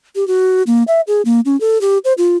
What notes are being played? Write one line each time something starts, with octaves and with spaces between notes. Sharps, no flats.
G4
F#4
A#3
E5
G#4
A#3
C#4
A4
G4
C5
F4